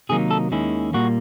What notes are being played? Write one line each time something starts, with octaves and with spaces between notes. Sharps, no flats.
C3 D#3 F#3 A#3 D#4 G#4
A4
D#2 D#3 G#3 C#4 E4
A#2 G3 A#3 F#4